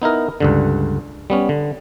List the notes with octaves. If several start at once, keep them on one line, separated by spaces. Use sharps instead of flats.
B3 D#4 E4 A#4
C#2 G2 D3
G3 B3 C#4
D3